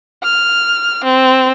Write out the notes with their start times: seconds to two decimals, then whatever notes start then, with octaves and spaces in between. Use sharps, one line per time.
0.24 F6
1.04 C4